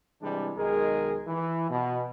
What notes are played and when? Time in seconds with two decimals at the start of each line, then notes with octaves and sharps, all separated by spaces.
0.22 C3 E3 G3 G#3 D4
0.57 B1 D#3 G#3 G#4 A#4
1.27 E3
1.70 B2